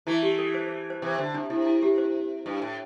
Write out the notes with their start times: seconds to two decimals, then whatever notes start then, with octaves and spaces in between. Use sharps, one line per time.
0.07 E3 A3 E4
0.23 G4
0.38 A4
0.54 C5
0.66 C5
0.90 C5
1.02 C3 E3 C5
1.18 D3 C5
1.34 C3 D4
1.50 C3 E4
1.66 E4
1.83 G4
1.98 C5
2.46 G2
2.62 A2